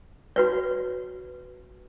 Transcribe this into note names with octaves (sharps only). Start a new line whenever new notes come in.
F#4 B4 C#5